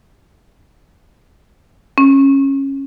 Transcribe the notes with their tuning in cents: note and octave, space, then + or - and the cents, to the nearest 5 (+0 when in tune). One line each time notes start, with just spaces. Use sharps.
C#4 -20